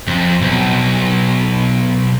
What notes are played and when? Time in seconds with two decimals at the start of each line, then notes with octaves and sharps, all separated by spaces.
0.07 F2
0.41 B1